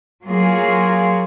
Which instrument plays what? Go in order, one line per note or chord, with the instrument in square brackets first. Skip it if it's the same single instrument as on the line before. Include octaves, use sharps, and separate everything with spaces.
[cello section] F#3 A#3 F4 G#4